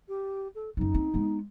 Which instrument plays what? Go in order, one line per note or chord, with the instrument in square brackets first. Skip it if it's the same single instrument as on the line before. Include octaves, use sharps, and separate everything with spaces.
[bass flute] G4
A4
[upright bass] F#2 F#3 [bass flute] D#4
[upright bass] C4
G#3 B3